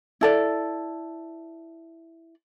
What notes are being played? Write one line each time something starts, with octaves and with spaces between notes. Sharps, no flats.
E4 A4 D5